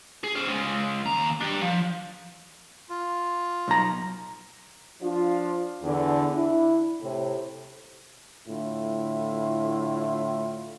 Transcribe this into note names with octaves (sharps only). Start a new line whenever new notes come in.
G#4
C#4 C5
C#3 G#3
D#2 A#5
G3 D4
F3
F4
B1 A#5
F3 D4 F4
E2 D3
D4 E4
A2 C3
A2 D3 E4 F4